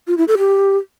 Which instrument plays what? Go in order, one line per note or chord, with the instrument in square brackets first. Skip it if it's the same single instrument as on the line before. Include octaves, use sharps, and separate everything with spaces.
[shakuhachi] F4
E4
A4
G4